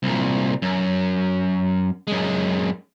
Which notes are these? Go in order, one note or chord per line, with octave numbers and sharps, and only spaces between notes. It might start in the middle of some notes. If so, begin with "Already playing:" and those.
C2 A#2
F#2
F#2 G#3